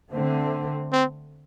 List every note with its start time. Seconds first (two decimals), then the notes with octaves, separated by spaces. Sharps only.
0.12 D3 A3 C4
0.92 C4